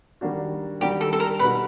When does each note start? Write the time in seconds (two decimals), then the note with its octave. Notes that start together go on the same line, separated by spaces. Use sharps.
0.21 D#3 G3 A#3 D4 F#4
0.81 D#3 G3 A#3 D4 F#4 G4
1.01 A4
1.13 A4
1.20 A#4
1.39 B2 G3 A#3 D#4 F#4 B4